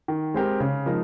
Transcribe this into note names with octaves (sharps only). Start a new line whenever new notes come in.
D#3
G#3 C4 G4 A#4
C#3
F3 G#3 D#4 A#4